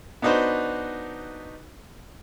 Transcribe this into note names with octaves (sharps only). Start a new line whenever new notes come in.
B3 D4 D#4 F#4 B4 C5